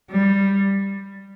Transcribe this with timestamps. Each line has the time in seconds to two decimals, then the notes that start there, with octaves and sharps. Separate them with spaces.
0.10 G3